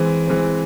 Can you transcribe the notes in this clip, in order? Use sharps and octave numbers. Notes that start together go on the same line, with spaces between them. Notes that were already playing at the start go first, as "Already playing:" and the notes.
Already playing: E3 G#3 C4
E3 G#3 C4